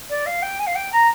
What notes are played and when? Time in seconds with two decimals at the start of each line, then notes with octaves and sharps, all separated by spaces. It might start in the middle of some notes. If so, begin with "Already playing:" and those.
0.09 D5
0.26 F5
0.42 G5
0.59 G#5
0.66 F5
0.75 G5
0.92 A#5